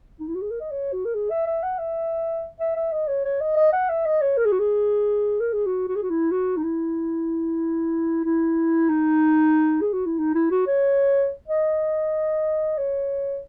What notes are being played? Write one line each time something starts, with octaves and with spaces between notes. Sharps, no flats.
D#4
E4
F#4
G#4
A#4
D#5
C#5
F#4
A#4
G#4
E5
E5
F#5
E5
E5
E5
D#5
C#5
C#5
D#5
D#5
F#5
E5
D#5
C#5
A#4
G#4
F#4
G#4
A#4
G#4
F#4
F#4
G#4
F#4
E4
F#4
D#4
E4
E4
D#4
G#4
F#4
E4
D#4
E4
F#4
C#5
D#5
C#5